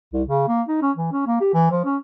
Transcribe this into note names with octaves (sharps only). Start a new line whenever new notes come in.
C2
C#3
A#3
D#4
C#4
E3
C#4
A#3
G4
E3
F3
C#4